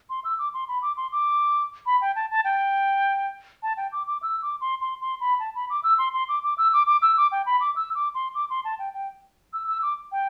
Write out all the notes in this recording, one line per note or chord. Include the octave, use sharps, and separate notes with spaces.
C6
E6
D6
C6
B5
D6
C6
D6
B5
G5
A5
A5
G5
A5
G5
D6
D6
E6
D6
C6
C6
C6
B5
A5
B5
D6
E6
C6
C6
D6
D6
E6
D6
D6
E6
D6
G5
B5
D6
E6
D6
C6
D6
C6
A5
G5
G5
E6
E6
D6
G5